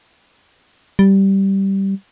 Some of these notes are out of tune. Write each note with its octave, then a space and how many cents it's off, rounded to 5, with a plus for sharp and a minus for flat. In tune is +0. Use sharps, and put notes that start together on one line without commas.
G3 -10